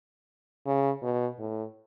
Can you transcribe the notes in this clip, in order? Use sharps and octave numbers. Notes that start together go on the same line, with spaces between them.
C#3
B2
A2